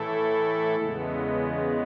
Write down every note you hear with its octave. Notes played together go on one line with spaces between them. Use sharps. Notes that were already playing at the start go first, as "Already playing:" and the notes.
Already playing: A2 E3 A3 E4 A4
E2 C#3 G#3 B3